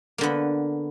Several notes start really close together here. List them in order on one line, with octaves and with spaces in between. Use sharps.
A#3 D3 B3